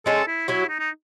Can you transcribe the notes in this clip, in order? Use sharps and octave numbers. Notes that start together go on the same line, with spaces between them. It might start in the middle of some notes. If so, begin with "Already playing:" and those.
G#3 C#4 G#4 A4
E4
F#3 C#4 E4 F#4
D#4
D#4